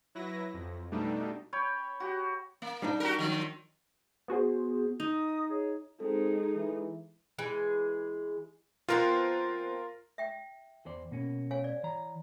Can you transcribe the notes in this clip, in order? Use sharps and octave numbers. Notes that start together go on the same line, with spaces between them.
F#3 E4 B4 A#6
F2
B2 G3 A3 D4 D#4
C#5 G5 B5
F#4 G4
A#3
G3 D4 D#4
F#4 G4 A#4
D#3 F3
B3 F#4 G#4 C5
D#4 D#5 D#6
G#4 C#5
G#3 C4 D#4 A4
E3
E3 G#3 G#4
F3 B3 C4 F4 A#4 C6
E5 G5
E2 C5 D5
B2 A#3 C#4
C#5 F5 G#5
D5
E3 A#5